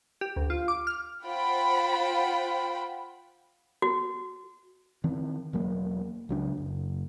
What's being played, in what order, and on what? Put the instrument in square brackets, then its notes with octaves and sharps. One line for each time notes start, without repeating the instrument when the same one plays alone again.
[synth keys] G4
D2
F4
D6
F6
[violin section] F4 C5 F#5 G5 B5
[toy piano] F#4
[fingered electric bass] D#3 E3 C4
E1 F#3 A#3
C#2 F#3 D4
F#1